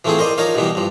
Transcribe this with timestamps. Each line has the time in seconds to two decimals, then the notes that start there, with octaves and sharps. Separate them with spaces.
0.05 E3 F3 A3 C4 F4 G#4
0.19 A#4 C5 D5 D#5
0.38 F3 D#4 A#4 C#5 F5
0.55 B2 E3 G3 B3
0.75 G2 F3